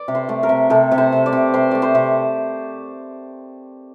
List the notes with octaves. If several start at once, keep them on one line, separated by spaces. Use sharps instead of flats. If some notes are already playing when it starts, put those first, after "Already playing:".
Already playing: D5
C3
C5
A3
A#4
C3
C3 A4
C3
C5
C3
D5
C3
C3 C5
A3 D5
C5
C3